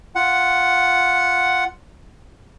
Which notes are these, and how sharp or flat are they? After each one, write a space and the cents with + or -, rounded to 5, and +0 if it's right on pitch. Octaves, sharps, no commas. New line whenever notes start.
F4 +0 F#5 +0